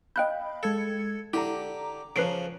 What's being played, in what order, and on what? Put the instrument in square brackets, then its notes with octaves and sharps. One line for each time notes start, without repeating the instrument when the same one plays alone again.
[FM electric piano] D#5 F5 B5 [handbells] G5 F#6 G6
[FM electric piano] G#3 G#6 C#7 [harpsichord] A4
[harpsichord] D3 G4 [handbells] E4 [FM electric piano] A#5 D6
[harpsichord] C#3 F3 [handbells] B4 C7 D7